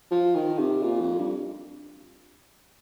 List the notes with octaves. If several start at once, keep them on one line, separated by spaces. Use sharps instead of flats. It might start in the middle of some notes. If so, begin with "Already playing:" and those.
F3
D#3
C3
A#2
F2
G2